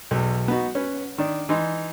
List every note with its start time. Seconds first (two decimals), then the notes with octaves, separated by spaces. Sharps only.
0.11 B1 E2
0.48 B3 D#4 F#4
0.75 C#4 B4
1.18 D#3 D4
1.49 E3 D#4 C6